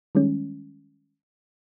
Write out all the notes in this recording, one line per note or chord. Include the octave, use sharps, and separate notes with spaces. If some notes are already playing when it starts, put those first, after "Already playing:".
D#3 G3 G#3 C#4